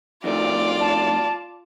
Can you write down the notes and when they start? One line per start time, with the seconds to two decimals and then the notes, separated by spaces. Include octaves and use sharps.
0.24 F2 D#3 A3 F4 D5
0.80 A5